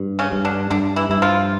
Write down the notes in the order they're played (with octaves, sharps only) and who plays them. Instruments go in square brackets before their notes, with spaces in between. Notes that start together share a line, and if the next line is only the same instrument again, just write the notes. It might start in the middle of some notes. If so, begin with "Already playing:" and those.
Already playing: [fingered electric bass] G2
[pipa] C#3 C#4
[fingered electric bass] G2
[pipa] D3 D4
[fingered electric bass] G2 [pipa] D3 D4
[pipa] E3 E4
[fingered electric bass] G2 [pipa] E4
[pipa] F3 F4